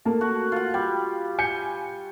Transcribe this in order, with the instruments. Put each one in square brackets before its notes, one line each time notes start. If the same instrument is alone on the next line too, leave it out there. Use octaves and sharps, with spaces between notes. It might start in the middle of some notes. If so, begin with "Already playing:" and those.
[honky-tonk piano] A3 A#3 A5
[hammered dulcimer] F#4
F4 F#5
[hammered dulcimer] G3 [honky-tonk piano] G5
[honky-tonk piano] G#5 G6 C#7